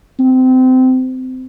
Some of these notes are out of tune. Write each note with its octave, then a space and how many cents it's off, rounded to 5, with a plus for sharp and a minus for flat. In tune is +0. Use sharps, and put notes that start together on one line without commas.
C4 -25